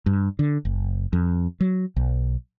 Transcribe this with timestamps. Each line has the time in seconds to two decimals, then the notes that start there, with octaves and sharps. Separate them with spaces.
0.06 G2
0.39 D3
0.65 F#1
1.13 F2
1.61 F#3
1.96 B1